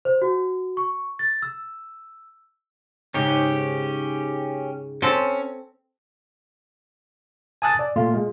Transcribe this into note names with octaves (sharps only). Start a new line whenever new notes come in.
C5
F#4
C#6
A6
E6
G#2 C#3 C#4 D#4 G4
C4 C#4 A4
G#5 A5 D#6 E6 F#6 A6
D5
A#2 A3 F4
G#3